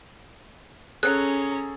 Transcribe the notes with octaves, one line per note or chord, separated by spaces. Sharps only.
C#4 G#4 A4 C#5 A#5 F#6